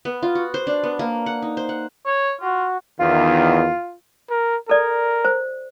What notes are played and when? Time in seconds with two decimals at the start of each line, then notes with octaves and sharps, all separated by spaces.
0.05 B3
0.23 F4
0.35 F#4
0.54 C5
0.67 D4
0.84 B3
0.99 A#3
1.26 F#5
1.43 D#4
1.57 C5
1.69 F#5
2.06 C#5
2.41 F4 F#4
3.00 E2 D#3 F4
4.30 A#4
4.69 A4 A#4 D5
5.25 C5